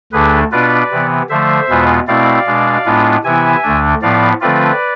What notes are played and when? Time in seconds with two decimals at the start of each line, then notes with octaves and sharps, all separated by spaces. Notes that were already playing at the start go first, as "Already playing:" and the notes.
0.12 D2 D3 A3 D4 G#4 B4
0.52 B2 B3 D4 F4 B4 D5
0.91 C3 E3 B3
1.29 D3 F3 A3 C5 E5
1.69 E2 B2 G#3 B3 F4
2.07 B2 A3 C4 E4 D5 F5
2.46 B2 G#3 D4
2.85 A2 G#3 B3 D4 F4
3.24 C3 E3 B3 E4 E5 G#5
3.63 D2 D3 A3 D4
4.02 A2 F3 B3 D5 F5
4.41 D3 F3 A3 C4 F4 B4 D5